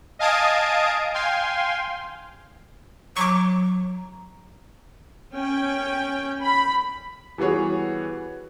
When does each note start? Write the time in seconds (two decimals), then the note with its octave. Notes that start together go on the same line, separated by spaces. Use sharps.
0.19 D#5 F5 G#5 A5 D#6 D7
1.14 F5 G5 G#5 C6
3.17 F#3 A#5 C#6 D6
5.34 C#4 G5
6.42 B5
7.38 E3 G3 B3 F#4 G#4 C#5